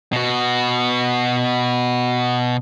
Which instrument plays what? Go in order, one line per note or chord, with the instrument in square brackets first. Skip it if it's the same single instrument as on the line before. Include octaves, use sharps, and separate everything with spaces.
[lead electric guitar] B2 F#4